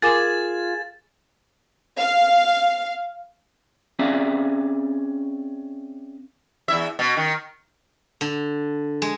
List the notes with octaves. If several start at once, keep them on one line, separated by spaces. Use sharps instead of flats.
F4 G#4 A#4 G#5 D6 A6 E7
F5
C4 C#4 G#4 D5 E5 F5
E2 E4 E5
B2
D#3
D3
G#3